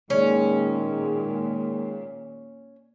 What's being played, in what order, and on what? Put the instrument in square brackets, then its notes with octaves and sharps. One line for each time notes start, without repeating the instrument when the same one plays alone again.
[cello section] A#2 [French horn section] D#3 G#3 [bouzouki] C#4